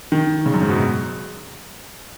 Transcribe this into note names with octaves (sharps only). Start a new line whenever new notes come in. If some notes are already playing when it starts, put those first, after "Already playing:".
D#3
C#3
F#2
G#2
B2